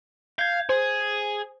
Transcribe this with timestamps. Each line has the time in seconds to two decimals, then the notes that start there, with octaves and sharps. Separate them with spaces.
0.39 F5 G6 G#6
0.69 G#4 C5